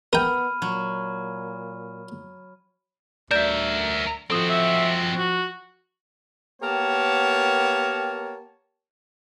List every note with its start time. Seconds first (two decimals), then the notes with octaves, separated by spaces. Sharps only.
0.13 B3 A#4 G5 B5 F6 D#7
0.62 A#2 F#3
3.31 D2 A#4 D5 E5 G6 E7
4.30 F3 C4 F#4 A4 D#6
4.50 E5
5.18 F#4
6.62 A#3 B3 G4 A#4 C#5 A5